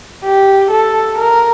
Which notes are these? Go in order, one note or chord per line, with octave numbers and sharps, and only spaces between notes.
G4
A4
A#4